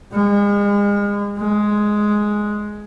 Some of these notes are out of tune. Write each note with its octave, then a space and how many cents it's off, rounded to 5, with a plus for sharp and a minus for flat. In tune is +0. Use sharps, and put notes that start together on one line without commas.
G#3 -35
G#3 +5